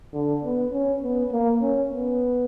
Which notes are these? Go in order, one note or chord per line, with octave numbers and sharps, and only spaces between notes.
D3
B3
C#4
B3
A#3
C#4
B3